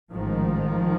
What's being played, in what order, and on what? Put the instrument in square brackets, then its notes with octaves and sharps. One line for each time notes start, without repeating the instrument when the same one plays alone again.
[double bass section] A1 G#2 D#3 F3